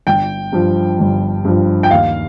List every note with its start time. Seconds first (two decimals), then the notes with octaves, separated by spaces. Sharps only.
0.07 G1 G5
0.53 G2 F3
0.99 G1
1.45 G2 F3
1.83 G5
1.90 D#2 F5